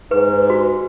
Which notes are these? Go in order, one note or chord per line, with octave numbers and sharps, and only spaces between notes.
G#2 B4
F#4